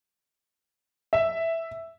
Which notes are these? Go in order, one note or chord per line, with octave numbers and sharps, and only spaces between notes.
E5